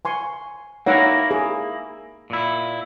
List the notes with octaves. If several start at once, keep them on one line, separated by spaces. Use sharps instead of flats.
G#5 C6 C#6
A#3 D#4 E4 A#4 C#5 F#5
G#4
A#2 E4